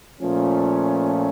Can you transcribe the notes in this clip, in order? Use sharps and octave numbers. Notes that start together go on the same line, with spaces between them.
A#2 F3 A3 C#4